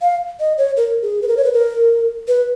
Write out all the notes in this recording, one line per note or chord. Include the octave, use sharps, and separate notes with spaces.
F5
D#5
C#5
A#4
G#4
B4
A#4
C#5
B4
A#4
B4